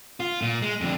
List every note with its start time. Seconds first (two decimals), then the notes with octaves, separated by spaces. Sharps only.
0.20 F4
0.42 A#2
0.62 G#3
0.81 F2 D3